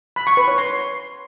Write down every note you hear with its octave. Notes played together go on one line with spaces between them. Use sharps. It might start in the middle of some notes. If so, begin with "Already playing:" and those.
B5
C#6
B4
C#5
C6